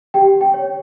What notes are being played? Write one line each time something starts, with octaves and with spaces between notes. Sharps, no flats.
G4 G5
G5
C#5